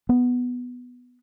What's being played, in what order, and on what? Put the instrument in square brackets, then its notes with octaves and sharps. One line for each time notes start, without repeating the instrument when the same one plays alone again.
[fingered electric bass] B3